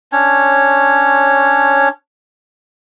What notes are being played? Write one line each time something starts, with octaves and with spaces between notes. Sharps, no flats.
C#4 D4 C#5